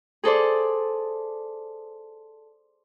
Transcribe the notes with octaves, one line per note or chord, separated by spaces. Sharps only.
G#4 A4 C5 D5